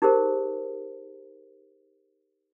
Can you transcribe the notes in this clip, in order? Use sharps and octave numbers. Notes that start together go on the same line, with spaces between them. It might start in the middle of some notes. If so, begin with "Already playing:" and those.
D#4 G4 G#4 A#4 C5